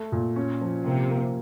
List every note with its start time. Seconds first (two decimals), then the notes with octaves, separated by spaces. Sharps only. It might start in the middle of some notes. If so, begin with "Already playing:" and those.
Already playing: A3
0.12 A#2
0.36 C#4
0.61 F3
0.85 C3 A#3
1.10 A#3